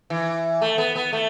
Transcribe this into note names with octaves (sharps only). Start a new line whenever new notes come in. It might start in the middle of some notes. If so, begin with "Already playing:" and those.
E3
A3
B3
B3
A3